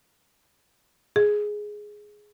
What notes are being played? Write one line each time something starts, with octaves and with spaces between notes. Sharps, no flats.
G#4